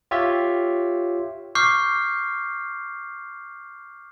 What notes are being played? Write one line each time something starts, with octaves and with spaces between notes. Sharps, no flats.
F4 G4 C#5 E5
C#6 D6 F6 G6 C7